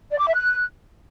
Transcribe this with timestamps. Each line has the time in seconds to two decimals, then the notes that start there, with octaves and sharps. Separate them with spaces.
0.11 D5
0.19 D6
0.27 E5
0.35 F#6